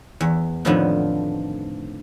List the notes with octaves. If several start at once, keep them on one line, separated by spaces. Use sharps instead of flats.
E2
F2 A2 D3 D#3 F3 B3